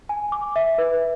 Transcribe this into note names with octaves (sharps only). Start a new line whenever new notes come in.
G#5
D6
E5
B4